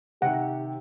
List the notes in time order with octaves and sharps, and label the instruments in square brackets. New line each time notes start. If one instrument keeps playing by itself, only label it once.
[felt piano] C3 D#3 [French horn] G4 [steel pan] F#5